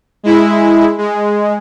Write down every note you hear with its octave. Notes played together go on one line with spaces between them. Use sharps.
G#3 E4
G#3